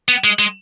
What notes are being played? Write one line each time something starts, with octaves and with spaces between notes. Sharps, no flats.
B3
G#3
G#3